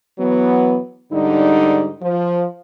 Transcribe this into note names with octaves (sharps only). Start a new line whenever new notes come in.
E3 F#3 B3
G#2 D3 G3 D#4
F3